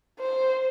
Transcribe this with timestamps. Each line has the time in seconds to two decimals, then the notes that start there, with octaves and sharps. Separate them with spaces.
0.19 C5